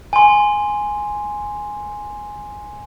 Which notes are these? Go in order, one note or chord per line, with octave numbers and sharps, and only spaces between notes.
G#5 C6